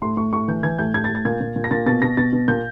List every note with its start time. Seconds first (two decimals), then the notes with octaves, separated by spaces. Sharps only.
0.02 A2 C6
0.17 A2 C#6
0.33 A2 C#6
0.48 E3 G6
0.63 E3 G#6
0.78 A2 G6
0.94 A2 G#6
1.04 A6
1.09 A2
1.15 A6
1.25 A#2 G#6
1.41 A#2
1.56 A#2
1.64 A#6
1.71 A#2 A6
1.86 B2 A6
2.02 B2 A#6
2.17 B2 A6
2.33 B2
2.48 A#2 G6